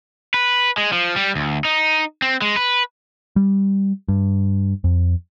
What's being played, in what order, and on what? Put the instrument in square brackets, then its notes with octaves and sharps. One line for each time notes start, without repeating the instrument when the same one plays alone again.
[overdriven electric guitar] B4
G#3
F3
G3
D2
D#4
C4
G#3
B4
[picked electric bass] G3
G2
F2